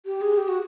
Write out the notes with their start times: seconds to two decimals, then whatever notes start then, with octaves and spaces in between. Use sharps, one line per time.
0.06 G4
0.21 G#4
0.38 G4
0.48 F#4